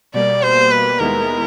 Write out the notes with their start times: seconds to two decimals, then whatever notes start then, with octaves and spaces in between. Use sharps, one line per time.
0.14 B2 G3 A#3 D5
0.43 C5
0.71 B4
0.99 D#2 D#3 G#3 B3 E4 A#4